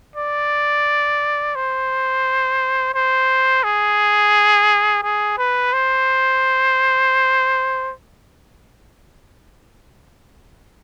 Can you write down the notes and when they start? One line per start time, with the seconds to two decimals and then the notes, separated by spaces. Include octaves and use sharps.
0.16 D5
1.56 C5
2.94 C5
3.63 G#4
5.03 G#4
5.38 B4
5.73 C5